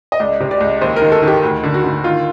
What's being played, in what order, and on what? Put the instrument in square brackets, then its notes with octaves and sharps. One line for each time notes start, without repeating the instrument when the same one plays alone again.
[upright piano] D#5
C#2 D5
C3
D5
C#2
D#2 C5
A#4
D#3
A4
D#3 G4
D2
D3
F#4
D3
D#3 F4